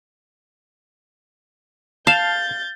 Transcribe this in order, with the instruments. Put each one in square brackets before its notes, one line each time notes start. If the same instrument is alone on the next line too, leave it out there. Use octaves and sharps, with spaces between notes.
[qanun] F5 [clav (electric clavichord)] A5 [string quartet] G6 A6